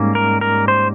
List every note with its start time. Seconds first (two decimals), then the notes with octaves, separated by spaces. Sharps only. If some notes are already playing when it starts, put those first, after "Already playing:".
Already playing: G#2 G3 A#3 C#4
0.15 A#4
0.41 A#4
0.68 C5